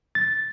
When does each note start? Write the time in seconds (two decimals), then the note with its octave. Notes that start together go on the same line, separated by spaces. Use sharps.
0.15 A6